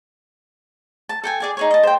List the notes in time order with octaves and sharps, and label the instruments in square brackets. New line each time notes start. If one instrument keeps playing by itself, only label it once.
[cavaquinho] A5
A4 G5 G#5
G#4 D5 G#5
D#4 G#4 C#5
D#5 A5
C5 G5